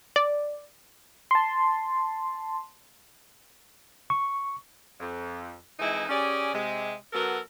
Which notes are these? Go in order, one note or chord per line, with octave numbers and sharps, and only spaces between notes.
D5
A5 C6
C#6
F2
F2 E3 G#3 D#4 E4
C#4 G4 G#4 D5
C3 G#3
F#3 B3 A4 A#4